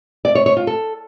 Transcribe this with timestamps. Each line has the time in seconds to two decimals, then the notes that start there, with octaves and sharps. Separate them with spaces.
0.25 D5
0.35 C#5
0.46 C#5
0.57 F4
0.67 A4